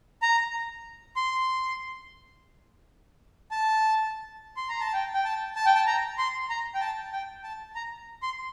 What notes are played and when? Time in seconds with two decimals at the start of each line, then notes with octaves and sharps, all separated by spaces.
0.22 A#5
1.16 C6
3.51 A5
4.57 C6
4.69 A#5
4.80 A5
4.93 G5
5.14 G5
5.25 A5
5.56 A5
5.66 G5
5.75 A5
5.87 A#5
6.18 C6
6.50 A#5
6.75 G5
6.81 A5
7.12 G5
7.44 A5
7.75 A#5
8.23 C6